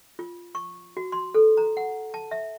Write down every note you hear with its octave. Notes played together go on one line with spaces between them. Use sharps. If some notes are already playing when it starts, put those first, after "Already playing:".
F4
C#6
F#4
C6
A4
A#5
F#5
A5
E5